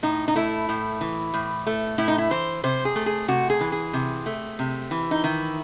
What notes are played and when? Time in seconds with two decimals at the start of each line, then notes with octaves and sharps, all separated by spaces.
0.03 A2 D#4
0.28 D#4
0.35 A3 E4
0.69 A2
1.01 E3
1.34 A2
1.67 A3
1.98 A2 E4
2.08 D#4
2.18 E4
2.31 E3 C5
2.64 C3 C5
2.85 G#4
2.96 A3
3.06 G#4
3.28 C3 F#4
3.50 G#4
3.61 E3
3.72 G#4
3.93 C3
4.26 A3
4.59 C3
4.91 E3
5.11 D#4
5.24 D#3 E4